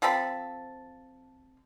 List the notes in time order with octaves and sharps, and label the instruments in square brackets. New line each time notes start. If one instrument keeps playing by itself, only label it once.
[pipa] F3 C4 A4 B5